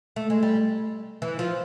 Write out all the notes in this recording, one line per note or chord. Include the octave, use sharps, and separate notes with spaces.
A3
G#3
G3
E3
F3